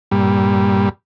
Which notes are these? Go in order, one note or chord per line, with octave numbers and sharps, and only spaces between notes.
G2 A#2 G3